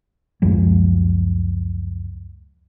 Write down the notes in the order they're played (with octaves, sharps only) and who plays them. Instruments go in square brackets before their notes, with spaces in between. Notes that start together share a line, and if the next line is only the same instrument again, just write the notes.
[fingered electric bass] C#2 F#2 F3 G#3